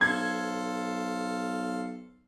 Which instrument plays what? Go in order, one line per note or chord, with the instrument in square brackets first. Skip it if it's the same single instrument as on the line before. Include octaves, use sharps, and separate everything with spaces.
[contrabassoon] B1 [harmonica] A4 C5 F5 [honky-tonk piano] G#6